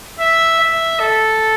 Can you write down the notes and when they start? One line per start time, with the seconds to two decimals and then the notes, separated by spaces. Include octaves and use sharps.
0.20 E5
0.60 E5
1.00 A4